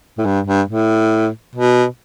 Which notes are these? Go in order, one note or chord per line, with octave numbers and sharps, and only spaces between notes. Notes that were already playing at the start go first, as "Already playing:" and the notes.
A2
G2
G2
A2
B2